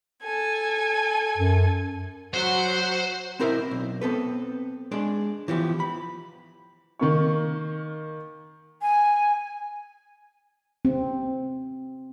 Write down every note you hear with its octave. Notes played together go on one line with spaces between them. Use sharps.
A4 G#5
F#2
F#3 C5 F#5
C4 E4 A#4 C5 D#5 E5
B1
B3 C4 A4 B4
G#3 D4 D5
E3 F3 B3 G4
B5
D#3 A#3 C#6
G#5
C4